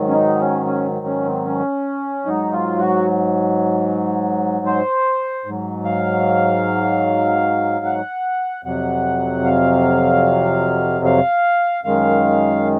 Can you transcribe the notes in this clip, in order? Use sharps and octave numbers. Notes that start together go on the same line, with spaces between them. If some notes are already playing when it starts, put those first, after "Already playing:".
Already playing: G#2 D#3 F#3
C#4
D#4
C#4
C#4
C#4
C4
C#4
G#2 F#3 D#4
F4
F#4
C5
G#2 F#3
F5
F#5
F2 C3 F#3 F#5
F5
F5
F#2 D#3 G#3 F5